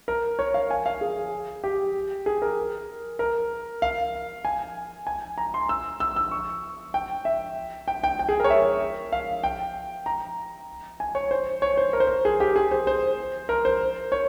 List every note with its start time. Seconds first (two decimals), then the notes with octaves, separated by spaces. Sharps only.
0.08 A#4
0.39 C#5
0.54 F5
0.71 G#5
0.86 F5
1.01 G#4
1.64 G4
2.26 G#4
2.42 A#4
3.19 A#4
3.82 F5
4.45 G#5
5.07 G#5
5.38 A#5
5.54 C6
5.69 E6
6.00 E6
6.16 E6
6.31 C#6
6.94 G5
7.25 E5
7.88 G5
8.04 G5
8.19 G5
8.29 G#4
8.40 A#4 C#5
8.50 E5
9.12 F5
9.43 G5
10.06 A#5
11.00 G#5
11.15 C#5
11.31 C5
11.62 C#5
11.77 C5
11.93 A#4
12.00 C5
12.07 A#4
12.25 G#4
12.40 G4
12.56 G#4
12.71 C5
12.87 C5
13.49 A#4
13.65 C5
14.12 C#5